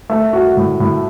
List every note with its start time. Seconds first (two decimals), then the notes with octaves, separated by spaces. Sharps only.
0.10 A3
0.33 F#4
0.57 A2
0.80 A2